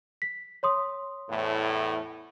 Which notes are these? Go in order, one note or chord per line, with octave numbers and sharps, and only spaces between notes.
B6
C#5 C6 D#6
E2 A2